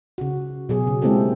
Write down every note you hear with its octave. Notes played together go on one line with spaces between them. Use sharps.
C#3 F#4
B2 F#3 G#4
C#3
G#3 A#3 C4 E4 G4 A4